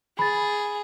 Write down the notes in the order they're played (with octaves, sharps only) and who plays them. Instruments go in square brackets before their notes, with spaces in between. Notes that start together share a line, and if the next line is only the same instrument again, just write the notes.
[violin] G#4 [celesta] B5 A6